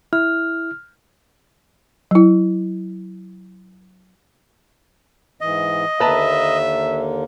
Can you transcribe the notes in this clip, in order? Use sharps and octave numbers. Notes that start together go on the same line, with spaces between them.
E4 F6
F#3 E4
G#2 E3 D#5
D#2 D3 A#3 B4 E5 A5 A#5